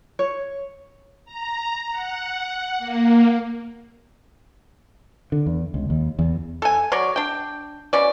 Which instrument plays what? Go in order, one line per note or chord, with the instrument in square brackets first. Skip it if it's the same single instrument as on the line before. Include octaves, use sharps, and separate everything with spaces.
[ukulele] C#5
[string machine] A#5
F#5
A#3
[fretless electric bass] D3
E2
C#2
D#2
E2
[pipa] A4 G#5
F#3 C#5 D5
D4 G5
B2 C#4 D5